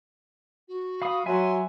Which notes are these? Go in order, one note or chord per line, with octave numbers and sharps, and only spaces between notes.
F#4
F5 B5 D#6
F#3 E5 G#5 C6